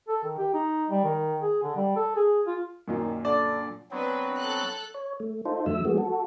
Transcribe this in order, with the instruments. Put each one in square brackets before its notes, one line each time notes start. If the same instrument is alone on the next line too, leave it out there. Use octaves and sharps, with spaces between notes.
[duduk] A4
D#3
G4
D#4
G3
D#3
G#4
D3
G3
A4
G#4
F4
[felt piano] F#2 A#2 F4 [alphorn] D#3
[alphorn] D3 [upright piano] D5
[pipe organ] F#3 B3 C4 [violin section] D4 B4
[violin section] A4 F#6
[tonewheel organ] C#5
A3
D#4 F4 A4 C5
F2 D3 F#3 A3 E5 E6
F3 G#3 A3 B3 F#4 G#4
F#4 A4